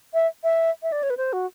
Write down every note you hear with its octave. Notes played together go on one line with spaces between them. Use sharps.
E5
E5
E5
D5
C#5
B4
C5
F#4